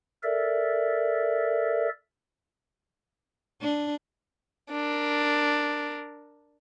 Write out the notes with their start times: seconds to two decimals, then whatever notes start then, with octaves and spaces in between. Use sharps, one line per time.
0.23 A4 A#4 D5 E5
3.62 D4
4.71 D4 A#4